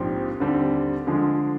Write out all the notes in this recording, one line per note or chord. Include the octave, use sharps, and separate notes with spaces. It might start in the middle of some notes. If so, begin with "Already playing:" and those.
Already playing: A#1 G#2 F3 C4 G4
D#2 D3 G3 C4 G4
D3 F3 G#3